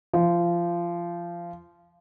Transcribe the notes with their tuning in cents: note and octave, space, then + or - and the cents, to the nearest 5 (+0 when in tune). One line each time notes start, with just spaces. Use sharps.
F3 -20